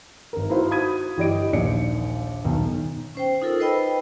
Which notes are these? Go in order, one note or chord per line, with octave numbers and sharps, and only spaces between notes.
G#1 A#4
D#4 E4 F#4 C5 F5
F#4 B5 D#6 G#6 D#7
G1 E3 G4 D5 D#5 D7
A#1 D#2 D5 C#7
D#1 B1 B2 D#3
C#4 C5 G5
D#4 F4 A4 A#4 E6
B4 C5 D#5 G5 B5